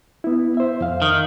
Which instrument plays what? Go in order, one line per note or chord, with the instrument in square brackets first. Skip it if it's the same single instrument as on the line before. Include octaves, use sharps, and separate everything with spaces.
[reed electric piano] B3 E4
C5 E5
F2 F5
[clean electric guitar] D#3